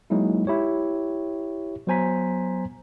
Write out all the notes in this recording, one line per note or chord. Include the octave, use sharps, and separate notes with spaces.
F#3 G#3 A#3 D#4 E4
E4 G4 C#5
F#3 B3 C5 G#5 A#5 B6